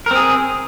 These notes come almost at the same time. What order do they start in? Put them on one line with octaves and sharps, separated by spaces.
A#4 C4 G#4